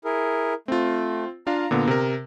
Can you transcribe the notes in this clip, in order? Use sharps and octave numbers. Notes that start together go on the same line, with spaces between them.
E4 G#4 A#4
A3 C4 F4
D4 F4 F5 A#5
A#2 D3 B3
C3 A#4